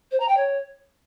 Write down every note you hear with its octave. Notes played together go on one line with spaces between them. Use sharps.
C5
A#5
G5
C#5